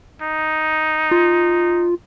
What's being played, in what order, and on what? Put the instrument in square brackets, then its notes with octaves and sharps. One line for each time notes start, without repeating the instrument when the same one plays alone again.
[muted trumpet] D#4
[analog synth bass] F4